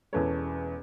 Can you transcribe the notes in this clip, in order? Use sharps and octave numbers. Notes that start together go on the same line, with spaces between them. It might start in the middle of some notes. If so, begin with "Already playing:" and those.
E1 E2 C#4 A4 B4 C#5